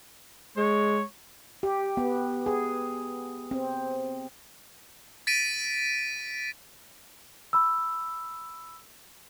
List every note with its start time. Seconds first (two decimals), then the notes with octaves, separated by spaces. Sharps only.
0.57 G#3 C#5
1.63 G4
1.97 B3
2.46 G#4
3.51 C4
5.27 A6 B6 D7 D#7
7.53 B5 E6